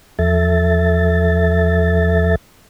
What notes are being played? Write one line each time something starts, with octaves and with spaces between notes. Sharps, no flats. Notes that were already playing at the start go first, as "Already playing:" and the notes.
E2 F3 A4 E5 A6